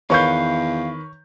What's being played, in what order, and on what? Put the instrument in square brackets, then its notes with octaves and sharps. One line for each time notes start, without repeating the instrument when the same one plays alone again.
[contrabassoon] E2 [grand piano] D#3 B4 [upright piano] C#5 C#6 G6 [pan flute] F5